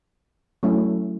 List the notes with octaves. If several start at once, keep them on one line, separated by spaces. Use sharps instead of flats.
F#3 A3 C#4 E4